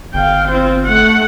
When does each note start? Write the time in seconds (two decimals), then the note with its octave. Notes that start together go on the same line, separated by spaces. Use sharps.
0.14 G1 F5 G5
0.48 C4 F4
0.86 A3 F#5